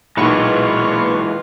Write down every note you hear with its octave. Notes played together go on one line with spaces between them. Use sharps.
B1 A#2 E3 G#3 F4 B4 C#6